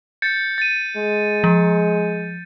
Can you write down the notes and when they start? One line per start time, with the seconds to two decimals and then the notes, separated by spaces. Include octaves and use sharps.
0.22 G6 A6 C#7
0.58 A6 D#7
0.97 G#3
1.44 F3